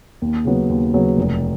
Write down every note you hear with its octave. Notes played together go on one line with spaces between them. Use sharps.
D#2
C#3 F#3 B3
D#2
C#3 F#3 B3
F1